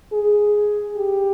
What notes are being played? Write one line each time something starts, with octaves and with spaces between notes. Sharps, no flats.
G#4
G4